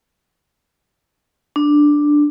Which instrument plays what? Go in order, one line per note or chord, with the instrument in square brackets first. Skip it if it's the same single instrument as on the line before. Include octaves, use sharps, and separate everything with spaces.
[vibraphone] D4